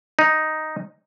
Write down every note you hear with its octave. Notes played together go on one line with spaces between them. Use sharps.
D#4